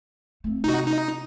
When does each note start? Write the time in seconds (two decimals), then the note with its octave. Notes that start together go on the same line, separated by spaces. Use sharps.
0.44 A3 C4
0.64 C3 D#4 F#4
0.87 D#4